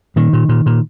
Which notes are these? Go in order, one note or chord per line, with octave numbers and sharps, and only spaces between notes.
A#2 D#3
A#2
A#2
A#2